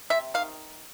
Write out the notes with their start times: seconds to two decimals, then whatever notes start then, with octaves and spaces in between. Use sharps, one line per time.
0.10 C3 E5
0.34 D#3 F5